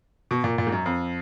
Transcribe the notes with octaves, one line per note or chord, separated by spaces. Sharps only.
B2
A#2
A#2
G#2
F#2
F2